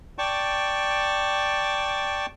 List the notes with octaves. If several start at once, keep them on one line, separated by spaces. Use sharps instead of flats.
D5 G5 A5 C#6